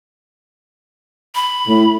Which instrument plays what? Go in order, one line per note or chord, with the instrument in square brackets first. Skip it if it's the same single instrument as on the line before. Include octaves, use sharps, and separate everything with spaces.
[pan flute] B5
[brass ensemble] A2